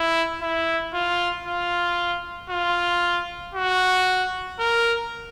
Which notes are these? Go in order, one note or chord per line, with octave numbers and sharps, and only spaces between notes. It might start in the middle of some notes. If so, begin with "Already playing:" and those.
Already playing: E4
E4
F4
F4
F4
F#4
A#4